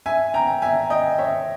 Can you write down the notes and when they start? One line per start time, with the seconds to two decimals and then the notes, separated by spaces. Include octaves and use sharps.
0.06 E5 G#5
0.34 G5 A#5
0.62 E5 G#5
0.90 D#5 G5
1.19 C#5 E5